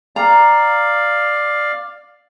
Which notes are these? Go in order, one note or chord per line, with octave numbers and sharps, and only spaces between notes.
D5 F5 A#5